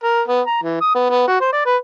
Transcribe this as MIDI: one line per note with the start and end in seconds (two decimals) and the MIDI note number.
0.04 0.21 70
0.28 0.41 59
0.47 0.57 82
0.62 0.80 52
0.81 0.94 87
0.95 1.05 59
1.10 1.24 59
1.28 1.40 66
1.41 1.52 72
1.53 1.65 74
1.66 1.76 71